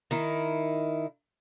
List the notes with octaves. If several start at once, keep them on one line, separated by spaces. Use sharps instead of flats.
D#3 D#4 E4